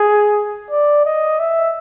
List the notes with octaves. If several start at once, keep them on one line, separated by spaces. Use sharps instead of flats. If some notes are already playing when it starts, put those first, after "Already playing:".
Already playing: G#4
D5
D#5
E5